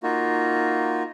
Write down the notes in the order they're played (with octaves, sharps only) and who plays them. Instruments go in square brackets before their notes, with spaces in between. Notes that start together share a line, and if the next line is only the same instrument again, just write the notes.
[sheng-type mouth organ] A#3 D#4 F4 F#4